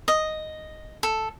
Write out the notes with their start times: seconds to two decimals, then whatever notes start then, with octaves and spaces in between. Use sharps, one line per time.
0.08 D#5
1.03 A4